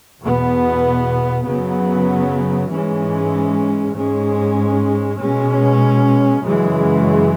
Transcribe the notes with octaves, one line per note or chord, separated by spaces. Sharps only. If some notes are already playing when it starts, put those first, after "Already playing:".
E2 B2 B3
F#2 C#3 F#3 B3
G#2 E3 G#3 C#4
G#2 G#3 C#4
B2 G#3 C#4
F#2 C#3 E3 G#3